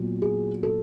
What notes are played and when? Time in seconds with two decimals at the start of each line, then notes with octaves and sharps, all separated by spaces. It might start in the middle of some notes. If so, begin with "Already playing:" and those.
Already playing: A#2 F#3 B3
0.22 G#4
0.63 A4